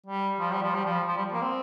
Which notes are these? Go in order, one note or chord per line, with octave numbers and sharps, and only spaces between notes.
G3
F3
G3
F3
G3
F3
F3
G3
A#3
C4